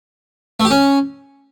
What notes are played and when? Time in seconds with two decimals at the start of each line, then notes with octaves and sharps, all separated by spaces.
0.60 A3
0.65 G4
0.71 C#4